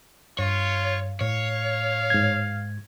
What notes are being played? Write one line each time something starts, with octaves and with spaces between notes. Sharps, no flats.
G2 F4 C#5 F5
A2 C#5 F5
G#2 G#6